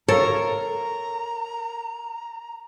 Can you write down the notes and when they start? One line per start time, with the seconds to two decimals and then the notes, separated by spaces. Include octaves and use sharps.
0.08 A4 A#4 C#5 F5 A#5